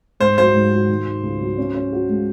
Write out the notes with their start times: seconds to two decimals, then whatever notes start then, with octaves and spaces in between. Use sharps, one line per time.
0.20 G#2 C5
0.38 F#3 C5
0.55 G#2
0.72 F#4
0.89 D#3
1.06 D#3
1.23 C#2
1.41 F#3
1.58 C#4
1.75 C#4
1.93 F#4
2.09 G#3